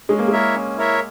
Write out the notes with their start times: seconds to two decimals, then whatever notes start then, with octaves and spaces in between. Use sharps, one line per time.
0.09 G#3 C#4
0.19 A#3
0.28 G#3 E4 A#4 C#5 E5
0.54 C#4
0.77 E4 A#4 C#5 E5